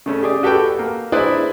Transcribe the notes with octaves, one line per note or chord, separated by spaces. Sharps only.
C#3 A3 C#4
G4 G#4 D5
F#4 G4 A4 B4 G5
A#3
D4 E4 G#4 B4 C5 D5